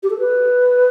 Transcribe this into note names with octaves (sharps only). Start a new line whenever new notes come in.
G4
A4
B4